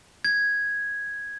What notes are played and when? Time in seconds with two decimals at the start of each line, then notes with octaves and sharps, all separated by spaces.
0.24 G#6